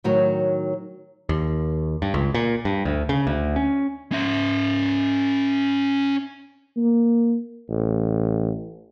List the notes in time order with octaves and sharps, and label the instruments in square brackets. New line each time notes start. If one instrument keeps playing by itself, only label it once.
[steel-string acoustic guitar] A2 D#3 F#3
[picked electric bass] D#2
G2
C#2
A#2
G2
D2
C#3
D2
C#4
[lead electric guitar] C#4 E5
[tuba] A#3
A1